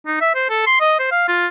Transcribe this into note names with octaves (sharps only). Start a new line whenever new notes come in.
D#4
E5
C5
A4
C6
D#5
C5
F5
F4